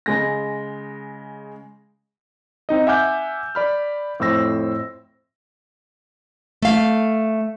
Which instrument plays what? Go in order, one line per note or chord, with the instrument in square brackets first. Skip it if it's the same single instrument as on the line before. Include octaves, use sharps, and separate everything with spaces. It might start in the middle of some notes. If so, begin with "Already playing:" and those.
[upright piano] C#3 G#3 A#6
[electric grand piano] C4 D#4 D#5
E5 F#5 G#5 D6 F6 G6
D5 B5 F6
F2 A2 C5 E6 A#6
[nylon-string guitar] A3 F5